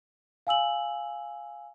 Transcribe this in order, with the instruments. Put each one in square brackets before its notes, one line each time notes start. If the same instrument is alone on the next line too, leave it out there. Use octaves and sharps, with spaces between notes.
[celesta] F5 G#5 E6 F#7